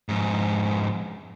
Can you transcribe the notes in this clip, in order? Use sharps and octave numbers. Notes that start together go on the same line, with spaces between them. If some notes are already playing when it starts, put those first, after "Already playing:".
F2 G#2